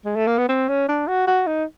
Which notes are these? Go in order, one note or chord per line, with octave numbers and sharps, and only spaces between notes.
G#3
A3
A#3
B3
C4
C#4
D4
F#4
F#4
D#4